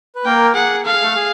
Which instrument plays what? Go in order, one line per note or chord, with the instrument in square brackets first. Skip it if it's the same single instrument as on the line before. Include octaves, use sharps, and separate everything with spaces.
[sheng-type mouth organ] B4
[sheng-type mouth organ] A#3 A#4 [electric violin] G5
[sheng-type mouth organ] G#4 [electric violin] F#5
[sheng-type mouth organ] A4 [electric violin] F5
[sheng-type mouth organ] G#4
A3 A4
G#4